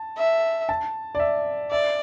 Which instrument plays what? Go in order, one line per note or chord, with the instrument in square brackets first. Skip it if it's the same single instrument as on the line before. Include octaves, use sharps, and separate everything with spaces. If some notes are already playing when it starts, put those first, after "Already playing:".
Already playing: [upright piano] A5
[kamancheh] E5
[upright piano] A5
D5
E5
[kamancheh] D5 [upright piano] E5